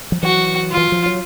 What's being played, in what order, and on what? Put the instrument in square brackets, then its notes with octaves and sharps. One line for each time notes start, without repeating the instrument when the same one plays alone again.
[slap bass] F3
[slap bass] E3 F#3 [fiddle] F#4
[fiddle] F4
[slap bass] E3
F3
F#3